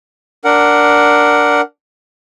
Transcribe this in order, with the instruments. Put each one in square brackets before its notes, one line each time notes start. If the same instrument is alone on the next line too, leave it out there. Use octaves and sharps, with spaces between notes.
[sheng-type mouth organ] D4 A#4 F#5